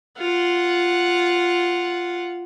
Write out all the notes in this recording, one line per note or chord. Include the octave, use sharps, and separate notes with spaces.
F4 F#5